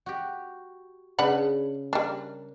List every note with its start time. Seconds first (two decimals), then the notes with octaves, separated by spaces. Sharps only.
0.06 F#4 G4
1.19 C#3 D4 B4 F#5
1.93 G3 D4 A#4